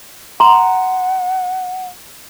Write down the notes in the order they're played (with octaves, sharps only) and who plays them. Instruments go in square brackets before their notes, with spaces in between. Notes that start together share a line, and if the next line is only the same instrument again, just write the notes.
[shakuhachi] F#5 [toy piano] A#5 C6